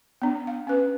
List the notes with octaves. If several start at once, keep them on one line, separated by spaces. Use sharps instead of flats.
B3 D4
F5
C#4 B4